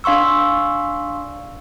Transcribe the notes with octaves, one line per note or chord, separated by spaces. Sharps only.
D4 F5 C6 C#6 E6